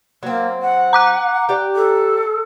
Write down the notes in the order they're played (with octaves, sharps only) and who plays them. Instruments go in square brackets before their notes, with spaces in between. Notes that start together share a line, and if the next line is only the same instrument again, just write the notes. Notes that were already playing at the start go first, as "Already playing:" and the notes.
[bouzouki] F#3 C4 [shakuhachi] A#3
[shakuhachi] F#5
[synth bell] A#5 D6 F#6
[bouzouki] G4 D5 G5
[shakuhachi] A4